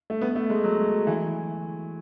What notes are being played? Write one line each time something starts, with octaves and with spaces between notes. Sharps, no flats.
A3
B3
A3
G#3
F#3
E3